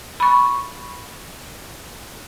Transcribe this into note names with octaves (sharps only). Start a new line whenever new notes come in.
B5 C#6